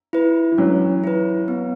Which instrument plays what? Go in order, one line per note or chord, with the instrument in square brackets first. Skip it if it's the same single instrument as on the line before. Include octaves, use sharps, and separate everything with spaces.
[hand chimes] E4 B4
[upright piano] E3
[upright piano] F#3 [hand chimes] C#4
[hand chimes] E4 B4
B3